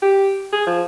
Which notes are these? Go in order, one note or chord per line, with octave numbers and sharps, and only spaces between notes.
G4
G#4
F3